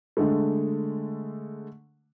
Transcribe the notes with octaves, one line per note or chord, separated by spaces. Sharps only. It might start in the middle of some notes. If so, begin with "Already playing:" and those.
D3 G#3 A3